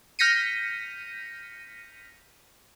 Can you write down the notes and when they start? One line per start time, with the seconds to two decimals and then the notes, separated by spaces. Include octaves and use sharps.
0.19 F6 G6 A#6 B6 C#7 D#7